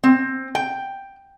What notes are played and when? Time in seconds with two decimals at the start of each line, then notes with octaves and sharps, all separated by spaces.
0.04 C4
0.55 G5